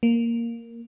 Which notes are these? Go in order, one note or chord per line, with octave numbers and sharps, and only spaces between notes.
A#3